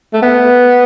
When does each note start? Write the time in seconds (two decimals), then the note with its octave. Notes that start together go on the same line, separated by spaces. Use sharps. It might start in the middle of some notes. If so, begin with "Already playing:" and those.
0.14 A3
0.22 B3